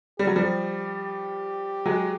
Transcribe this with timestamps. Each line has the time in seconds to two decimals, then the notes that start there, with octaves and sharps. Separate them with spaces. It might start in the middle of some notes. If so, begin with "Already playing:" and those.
0.19 G3 G4
0.27 F#3
0.36 F3 G3
1.86 F#3 G#3